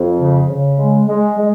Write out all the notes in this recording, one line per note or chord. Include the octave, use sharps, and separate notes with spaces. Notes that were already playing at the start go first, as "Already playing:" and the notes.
Already playing: F2
C#3
C#3
G#3
G#3
G#3